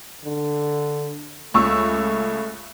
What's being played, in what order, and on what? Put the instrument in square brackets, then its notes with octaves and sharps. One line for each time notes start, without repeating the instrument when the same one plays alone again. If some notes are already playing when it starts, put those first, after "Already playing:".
[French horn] D3
[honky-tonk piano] C#2 C#6 E6 [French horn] A3